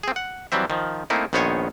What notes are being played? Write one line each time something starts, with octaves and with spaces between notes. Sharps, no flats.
C4 G#4
F#5
E3 F#3 G3 C4 E5
D#3 F3
A3 A#3 C4 D#4 E4
A#1 D#3 B3 C5 C#5 G#5